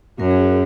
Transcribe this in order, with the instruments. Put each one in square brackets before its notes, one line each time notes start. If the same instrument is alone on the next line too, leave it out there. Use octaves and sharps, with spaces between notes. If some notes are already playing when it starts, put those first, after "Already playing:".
[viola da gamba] F#2 F#3 [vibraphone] A#4
[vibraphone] G#4
F#4